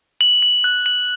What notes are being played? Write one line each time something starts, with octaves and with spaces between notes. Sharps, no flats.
F#7
F#7
F#6
F#7